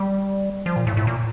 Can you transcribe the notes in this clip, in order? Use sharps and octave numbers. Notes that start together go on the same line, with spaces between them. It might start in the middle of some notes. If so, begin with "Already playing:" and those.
Already playing: G3
F3
A#2
A2
A2
A#2